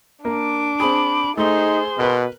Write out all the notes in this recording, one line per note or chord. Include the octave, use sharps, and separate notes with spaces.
A#3 D4 D6
C4 G#4 B5
A3 D#4 G#4 C5 C6
B2 A#4 B4